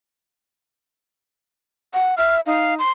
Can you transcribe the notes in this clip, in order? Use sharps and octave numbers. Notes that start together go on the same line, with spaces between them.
F#5
E5 F6
D#4 F5
C6